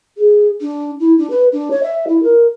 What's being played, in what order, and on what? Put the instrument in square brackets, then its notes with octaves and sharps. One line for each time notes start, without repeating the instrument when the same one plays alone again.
[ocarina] G#4
D4
E4
D4
B4
D4
C#5
E5
E4
A#4